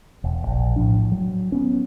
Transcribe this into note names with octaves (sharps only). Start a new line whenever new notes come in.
E1
A#1
A2 F3 D4
F#3
F#3 B3 C#4